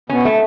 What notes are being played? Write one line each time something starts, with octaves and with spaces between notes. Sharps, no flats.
B2 C#4
A3